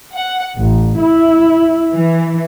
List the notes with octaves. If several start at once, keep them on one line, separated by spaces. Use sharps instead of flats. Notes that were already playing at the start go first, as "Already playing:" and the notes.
F#5
A1
E4
E3